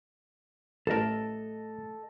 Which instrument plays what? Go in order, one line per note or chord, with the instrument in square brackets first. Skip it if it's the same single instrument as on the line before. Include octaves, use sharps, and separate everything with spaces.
[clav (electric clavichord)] A1 A#4 [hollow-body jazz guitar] A3 A5 [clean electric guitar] A4 D#5